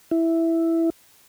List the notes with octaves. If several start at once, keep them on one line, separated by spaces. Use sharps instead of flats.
E4